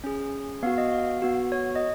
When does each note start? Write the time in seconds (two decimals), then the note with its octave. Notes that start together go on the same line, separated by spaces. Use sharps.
0.04 C#4 G#4
0.63 B3 F#4 F5
0.78 D#5
0.92 F5
1.22 B3 F#4
1.52 C#5
1.75 D#5